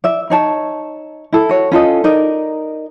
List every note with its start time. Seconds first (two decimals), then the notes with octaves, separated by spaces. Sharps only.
0.04 D5 E5
0.30 D#4 C#5 A5
1.33 E4 A4
1.49 F#4 C#5
1.72 C#4 F4 A4 D#5
2.04 D#4 A#4 D5 D#5